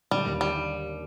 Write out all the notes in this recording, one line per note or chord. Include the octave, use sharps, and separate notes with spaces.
D3 G3
D#2
G3